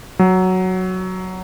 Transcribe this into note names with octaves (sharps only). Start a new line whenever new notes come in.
F#3